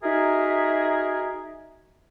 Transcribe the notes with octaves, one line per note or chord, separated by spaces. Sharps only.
D#4 F#4 G#4 A#4 E5